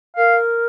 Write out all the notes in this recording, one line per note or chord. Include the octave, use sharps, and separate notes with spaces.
A#4 F5